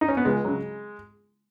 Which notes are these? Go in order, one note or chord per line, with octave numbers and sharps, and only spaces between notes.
D#4
C#4
B3
C#2 G#3
C#3 F#3